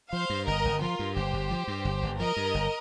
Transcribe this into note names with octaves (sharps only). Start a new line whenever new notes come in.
F3 C5 F5
G2
G1 A#4 D#5
G1
F3 F4 A#4
G2
G1 G4 C5
G1
F3
G2
G1
G1
F3 A#4 D#5
G2
G1